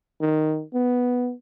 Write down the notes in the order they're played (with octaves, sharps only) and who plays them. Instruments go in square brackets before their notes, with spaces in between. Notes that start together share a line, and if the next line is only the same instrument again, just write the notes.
[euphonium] D#3
B3